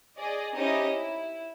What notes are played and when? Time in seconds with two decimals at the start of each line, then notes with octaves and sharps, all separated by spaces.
0.19 G#4 D5 D#5
0.54 C4 C#4 D#4 E4 G4 D#5
0.83 E4